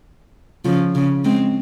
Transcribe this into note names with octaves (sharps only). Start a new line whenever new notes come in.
C#3 F3
C#3
G#3 C4